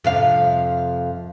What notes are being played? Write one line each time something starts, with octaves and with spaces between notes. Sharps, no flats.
F2 C3 F5